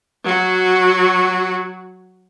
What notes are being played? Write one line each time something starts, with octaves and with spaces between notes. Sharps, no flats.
F#3 F#4